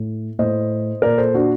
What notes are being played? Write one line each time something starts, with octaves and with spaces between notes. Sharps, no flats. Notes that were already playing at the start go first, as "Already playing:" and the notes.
Already playing: A2
A2 C5 D#5
A#2 A#4 D5
A4 C5
D4 F#4